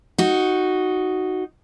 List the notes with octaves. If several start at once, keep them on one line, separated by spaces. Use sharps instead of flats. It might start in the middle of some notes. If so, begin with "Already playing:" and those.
D#4 F#4